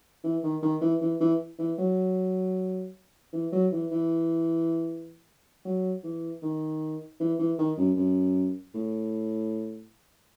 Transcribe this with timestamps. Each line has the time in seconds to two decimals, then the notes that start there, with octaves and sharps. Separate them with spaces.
0.23 E3
0.43 D#3
0.62 D#3
0.81 E3
1.01 E3
1.20 E3
1.58 E3
1.78 F#3
3.33 E3
3.52 F#3
3.72 E3
3.91 E3
5.65 F#3
6.03 E3
6.42 D#3
7.20 E3
7.39 E3
7.58 D#3
7.77 F#2
7.97 F#2
8.74 A2